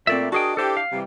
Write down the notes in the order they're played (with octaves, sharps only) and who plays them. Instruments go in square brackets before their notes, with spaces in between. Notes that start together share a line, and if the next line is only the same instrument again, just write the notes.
[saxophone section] A#2 A3 [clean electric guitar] C4 D5 E5
[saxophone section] D4 A#4 D#5 [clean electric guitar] F#4 G#4 G5
[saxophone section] D4 E4 G4 [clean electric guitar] A4 C5
[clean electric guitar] F5
[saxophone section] C3 E3 G3